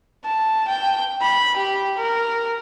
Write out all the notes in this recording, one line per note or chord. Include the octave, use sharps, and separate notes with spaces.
A5
G5
B5
G4
A#4